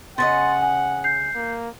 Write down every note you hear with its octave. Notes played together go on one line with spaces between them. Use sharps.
C#3 C#4 D#5 F#5 C6 A6
G#5
G6 C7
A#3